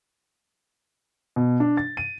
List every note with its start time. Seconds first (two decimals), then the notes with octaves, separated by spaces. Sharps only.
1.36 B2
1.60 D4
1.77 A6
1.97 D#7